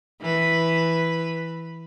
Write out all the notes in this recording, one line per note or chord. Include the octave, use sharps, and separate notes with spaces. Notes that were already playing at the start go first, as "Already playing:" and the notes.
E3 B4